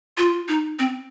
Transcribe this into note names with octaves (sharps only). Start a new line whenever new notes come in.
F4
D#4
C4